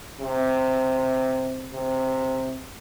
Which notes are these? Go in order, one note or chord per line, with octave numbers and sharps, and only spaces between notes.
C3
C3